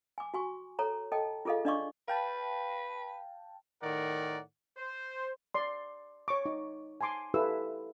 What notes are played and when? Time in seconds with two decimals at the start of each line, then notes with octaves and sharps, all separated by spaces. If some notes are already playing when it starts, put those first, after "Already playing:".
0.18 G#5 D6
0.34 F#4 G#5 C#6
0.79 A4 C#5 A#5
1.12 A4 D#5 G5 A5
1.45 F4 G#4 A4 D#5 F5
1.65 D4 D5 D#5 F5 C#6 D6
2.08 B4 F5 G5 A5
3.83 A2 D#3 A#4 D5 F#5
4.78 C5
5.54 D5 C6
6.28 C#5 C#6 D6
6.46 D#4
7.01 G#5 A5 C6 D6
7.34 E4 G4 A4 B4 F5 E6